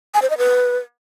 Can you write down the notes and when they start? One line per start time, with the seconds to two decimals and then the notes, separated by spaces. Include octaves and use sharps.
0.14 G#5
0.22 C5
0.30 D#5
0.38 B4